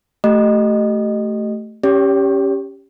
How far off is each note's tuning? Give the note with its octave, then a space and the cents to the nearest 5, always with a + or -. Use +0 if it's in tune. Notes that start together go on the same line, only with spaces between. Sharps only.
A3 +0 G4 -25 D#5 -15
C#4 +0 G4 +0 C#5 +45